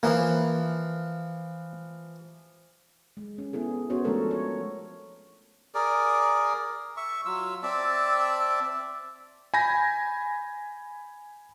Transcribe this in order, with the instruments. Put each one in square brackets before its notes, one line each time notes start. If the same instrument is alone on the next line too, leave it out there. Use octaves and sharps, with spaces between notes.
[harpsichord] E3 F3 [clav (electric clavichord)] A#3
[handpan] G#3
C#4
B3 E4 G#4 A4
B3 C#4 F#4 C5 C#5
F3 G#3 A3 D4 A4 A#4
C#5
[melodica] G#4 A#4 D5
E5 C#6
F#3 F4 E6
C4 D5 E5 A5
[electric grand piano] G#5 B5 G6 A#6